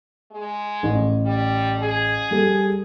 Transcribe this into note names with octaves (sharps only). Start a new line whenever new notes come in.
G#3
A1
G3
G#4
G3 A4